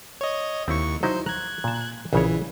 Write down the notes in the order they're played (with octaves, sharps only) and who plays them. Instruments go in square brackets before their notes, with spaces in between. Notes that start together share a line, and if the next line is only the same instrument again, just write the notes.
[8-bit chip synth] C#5 D#5
[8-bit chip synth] D#2 C#6 [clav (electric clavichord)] C4 E4
[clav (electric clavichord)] F#3 D#4 E4 [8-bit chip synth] C5
[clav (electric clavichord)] A#5 [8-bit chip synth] F#6 G#6
[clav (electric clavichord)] A#2 A5
[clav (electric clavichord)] A#1 C#3 C#5 [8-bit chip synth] E3